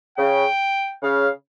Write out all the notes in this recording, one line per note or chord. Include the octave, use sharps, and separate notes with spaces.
C#3 G5
C#3 F5